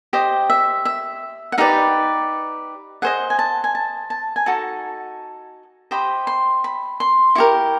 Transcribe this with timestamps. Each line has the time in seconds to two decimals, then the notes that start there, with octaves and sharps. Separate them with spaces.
0.13 G4 C5 D#5
0.50 E5
0.85 E5
1.52 F#5
1.58 D#4 G4 B4 D5 F5
3.02 G#4 C5 D#5 F#5
3.30 G#5
3.39 A5
3.64 G#5
3.75 A5
4.10 A5
4.36 G#5
4.46 D#4 F#4 A4 A5
5.91 G4 C5 D#5 B5
6.27 C6
6.64 B5
7.00 C6
7.35 E4 G4 A#4 C#6